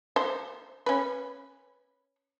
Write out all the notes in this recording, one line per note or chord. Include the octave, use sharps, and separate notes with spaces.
C5
C#4 B4